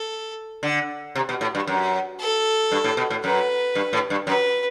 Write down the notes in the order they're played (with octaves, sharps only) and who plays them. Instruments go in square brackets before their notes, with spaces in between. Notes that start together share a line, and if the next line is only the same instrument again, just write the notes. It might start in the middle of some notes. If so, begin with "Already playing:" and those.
Already playing: [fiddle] A4
[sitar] D3
C3
B2
A2
G2
F#2
[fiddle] A4
[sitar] G2
A2
B2
A2
[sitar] F#2 [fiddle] B4
[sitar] G2
A2
G2
[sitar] F#2 [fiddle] B4